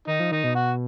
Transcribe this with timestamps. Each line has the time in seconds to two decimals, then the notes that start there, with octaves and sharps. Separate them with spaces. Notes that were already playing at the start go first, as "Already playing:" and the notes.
0.07 D#3 D#4
0.20 F3
0.32 D#3 D#4
0.44 B2
0.55 F#4